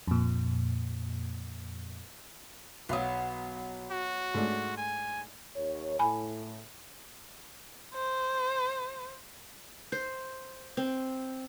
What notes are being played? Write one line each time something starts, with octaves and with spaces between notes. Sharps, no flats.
F2 A#2
B1 F#3 B3 F5 D#6
F#4
G#2 A3 D4
G#5
D#2 C#5
A2 G#5 B5
C5
C5
C4